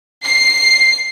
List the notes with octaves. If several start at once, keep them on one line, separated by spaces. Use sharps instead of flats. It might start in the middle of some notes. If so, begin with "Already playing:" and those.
C7